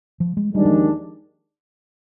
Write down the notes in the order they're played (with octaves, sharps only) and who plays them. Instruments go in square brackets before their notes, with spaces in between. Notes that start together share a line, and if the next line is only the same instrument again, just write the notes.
[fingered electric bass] F3
G#3
[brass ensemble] D#2 D#3 G#3 D4 [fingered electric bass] G3
[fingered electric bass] G3
F3